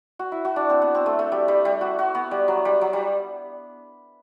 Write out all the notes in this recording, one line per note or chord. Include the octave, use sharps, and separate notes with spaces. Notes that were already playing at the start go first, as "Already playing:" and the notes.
F#4
E4
F#4
D4
C4
B3
C4
A3
A3
G3
G3
G3
F#4
F#4
B3
G3
F#3
G3
F#3
G3